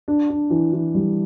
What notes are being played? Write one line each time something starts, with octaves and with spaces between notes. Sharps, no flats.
D4
D4
E3
E3
G3